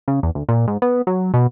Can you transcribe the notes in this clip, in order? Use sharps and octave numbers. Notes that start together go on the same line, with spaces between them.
C#3
E2
D2
A#2
G#2
B3
F#3
B2